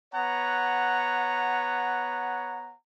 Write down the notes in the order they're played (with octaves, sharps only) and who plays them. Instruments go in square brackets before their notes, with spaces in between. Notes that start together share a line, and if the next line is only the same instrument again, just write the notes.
[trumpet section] B3 C#5 F#5 A#5